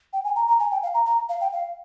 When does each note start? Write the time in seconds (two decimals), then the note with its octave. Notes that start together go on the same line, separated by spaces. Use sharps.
0.13 G5
0.24 G#5
0.36 A#5
0.48 A#5
0.60 G#5
0.71 G5
0.83 F5
0.94 A#5
1.06 A#5
1.29 F5
1.41 G5
1.52 F5